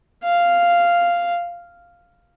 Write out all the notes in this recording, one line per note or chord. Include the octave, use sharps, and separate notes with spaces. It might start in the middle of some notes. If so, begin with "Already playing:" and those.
F5